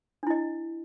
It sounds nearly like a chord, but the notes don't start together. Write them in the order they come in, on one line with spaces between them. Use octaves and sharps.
D4 E4 D#5